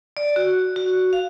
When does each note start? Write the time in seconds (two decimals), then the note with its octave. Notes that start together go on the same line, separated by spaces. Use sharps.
0.17 D5
0.36 F#4
0.76 F#4
1.13 F5